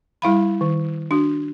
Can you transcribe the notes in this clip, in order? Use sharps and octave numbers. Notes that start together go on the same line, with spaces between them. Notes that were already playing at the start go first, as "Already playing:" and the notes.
G3 E4 F5 B5
D#3
D4 F#4